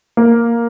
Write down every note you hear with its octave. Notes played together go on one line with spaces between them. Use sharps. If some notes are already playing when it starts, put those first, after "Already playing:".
A#3